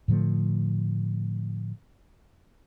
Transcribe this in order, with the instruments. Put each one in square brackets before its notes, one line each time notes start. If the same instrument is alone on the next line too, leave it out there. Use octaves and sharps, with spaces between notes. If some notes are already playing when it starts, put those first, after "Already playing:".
[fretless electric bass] A2 D3 F3 A3